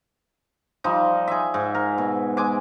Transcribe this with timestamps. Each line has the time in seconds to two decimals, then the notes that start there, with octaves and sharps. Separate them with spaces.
0.84 F3 G3 D#4
1.28 G#4 E5
1.54 G#2
1.75 A#4
1.98 B2
2.37 G#3 G#5 D6